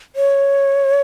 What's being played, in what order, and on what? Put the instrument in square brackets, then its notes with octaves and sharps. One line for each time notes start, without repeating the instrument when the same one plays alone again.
[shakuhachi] C#5